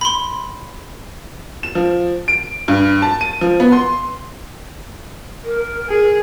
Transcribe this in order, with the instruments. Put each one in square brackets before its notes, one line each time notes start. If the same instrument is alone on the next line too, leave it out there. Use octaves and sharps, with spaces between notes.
[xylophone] B5 C6
[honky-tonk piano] E7
F3
D7
G2
A5
D#7
F3
B3
C6
[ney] A#4
[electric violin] G#4